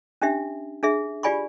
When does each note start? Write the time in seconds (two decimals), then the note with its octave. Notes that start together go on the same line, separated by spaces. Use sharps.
0.22 C#4 D4 G4 E5
0.83 D4 G#4 E5
1.23 F4 G4 D5 G#5 B5 C#6